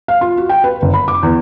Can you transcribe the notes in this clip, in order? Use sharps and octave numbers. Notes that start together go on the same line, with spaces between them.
F5
F4
F#4
G5
B4
F#1
B5
D6
E2